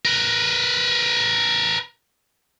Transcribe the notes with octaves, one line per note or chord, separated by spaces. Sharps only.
A#4 B4